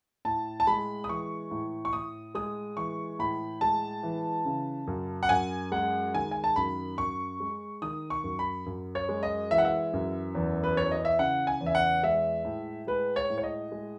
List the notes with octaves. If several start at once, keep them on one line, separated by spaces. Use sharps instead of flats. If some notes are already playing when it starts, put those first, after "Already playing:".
A2 A5
A5
G#3 B5
D#6
E3 C#6
A2
C#6
A2 D#6
G#3 D#6
E3 C#6
A2 B5
G#3 A5
E3
C#3
F#2
F#5
F#2 G#5
G#3 F#5
D#3 G#5
G#5
A5
F#2 B5
F#2 C#6
G#3
D#3 D#6
C#6
F#2
B5
F#2
C#5
G#3
D#5
E3 E5
F#5
E5
F#2
E2
B4
E3 C#5
D#5
E5
C#3 F#5
G#5
E2
E5
F#5
G#3 E5
A2
G#3 B4
C#5
A2
C#5
D#5
G#3